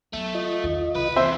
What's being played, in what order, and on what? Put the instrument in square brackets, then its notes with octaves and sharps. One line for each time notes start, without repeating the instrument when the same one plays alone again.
[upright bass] F#3 B3 [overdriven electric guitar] A3
[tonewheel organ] F4 D#5
[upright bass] E2 D#3
[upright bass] C2 [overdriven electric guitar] B4 B5
[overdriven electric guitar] E3 C4 [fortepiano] C5 E5